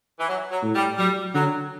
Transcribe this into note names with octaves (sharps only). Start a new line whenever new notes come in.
E3
F#3
F#3
A2
G3
F#3 G3
D3 F#3